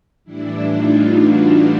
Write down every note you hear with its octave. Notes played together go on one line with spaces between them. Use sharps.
A2 E3 G3 D4 E4
D#4 F4
E4 F#4
F4 G4